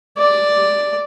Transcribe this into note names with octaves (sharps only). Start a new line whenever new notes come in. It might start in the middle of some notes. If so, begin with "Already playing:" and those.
D5